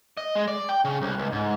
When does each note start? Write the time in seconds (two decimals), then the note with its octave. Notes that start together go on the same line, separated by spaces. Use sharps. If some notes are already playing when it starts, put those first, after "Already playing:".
0.17 D#5
0.35 G#3
0.48 D5
0.69 G5
0.85 C#3
1.02 C2
1.18 C#2
1.32 G#2